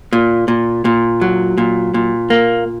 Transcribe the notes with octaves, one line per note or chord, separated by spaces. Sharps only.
A#2
A#2
A#2
F#3
A#2
A#2
A#3